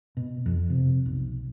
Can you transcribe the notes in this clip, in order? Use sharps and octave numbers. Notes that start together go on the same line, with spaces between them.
B2
F2
C3
B1